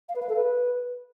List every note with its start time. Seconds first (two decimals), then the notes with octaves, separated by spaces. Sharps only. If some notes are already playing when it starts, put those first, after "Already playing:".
0.09 F5
0.16 B4
0.22 F5
0.29 A4
0.36 B4